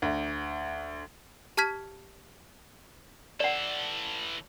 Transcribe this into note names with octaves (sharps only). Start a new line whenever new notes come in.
D2
G4 A5 F6 G#6 B6
E3 A4 D5 F#5